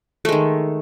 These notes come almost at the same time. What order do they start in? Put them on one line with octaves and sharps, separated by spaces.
A3 G#3 D#3